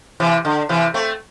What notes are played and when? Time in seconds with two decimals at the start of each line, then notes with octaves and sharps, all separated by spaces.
0.20 C3 E3
0.45 D3
0.69 C3 E3
0.94 A3 C4